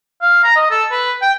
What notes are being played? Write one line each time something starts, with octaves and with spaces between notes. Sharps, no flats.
F5
A#5
D#5
A4
B4
G5